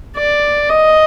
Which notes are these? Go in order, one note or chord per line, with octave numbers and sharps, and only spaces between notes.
D5
D#5